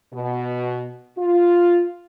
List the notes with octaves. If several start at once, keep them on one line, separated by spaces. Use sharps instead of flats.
B2
F4